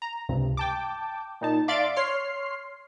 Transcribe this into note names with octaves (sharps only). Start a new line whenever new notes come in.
A#5
C#2 G2 C3
G5 A5 D6
A#2 D#4 A5
D5 E5 F5 C6 A6 D7
C#5 C6 F6 C7